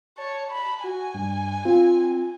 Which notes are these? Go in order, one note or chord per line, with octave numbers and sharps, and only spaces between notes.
C#5 A5
B5
F#4 G#5
G2
C4 F4